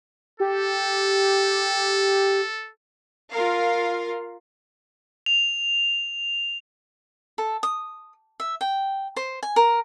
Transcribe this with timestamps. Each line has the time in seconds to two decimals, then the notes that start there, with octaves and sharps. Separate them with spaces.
0.40 G4 A4
3.32 F4 A#4 F5
5.26 F7
7.38 A4
7.63 D#6
8.40 E5
8.61 G5
9.16 C5
9.43 G#5
9.56 A#4